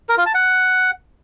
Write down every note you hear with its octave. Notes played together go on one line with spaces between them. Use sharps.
A#4
F4
A5
F#5